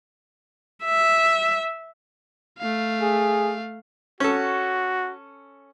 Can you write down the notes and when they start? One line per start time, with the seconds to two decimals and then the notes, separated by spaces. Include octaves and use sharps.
0.84 E5
2.59 A3 F5
3.02 G#4
4.20 C#4 F#4 A4